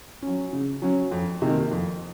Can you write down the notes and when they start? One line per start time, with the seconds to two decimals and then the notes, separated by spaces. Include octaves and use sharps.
0.22 F#3 C#4
0.53 C#3
0.82 F#3 C#4
1.11 F2
1.42 C3 D#3 A#3
1.71 F2